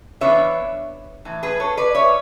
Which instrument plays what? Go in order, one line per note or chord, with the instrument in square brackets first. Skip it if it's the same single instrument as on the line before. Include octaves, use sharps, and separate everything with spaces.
[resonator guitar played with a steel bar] E3 B3 D4 C#5 E5
A2 E3
G#4 B4
A4 C#5
B4 D5
C#5 E5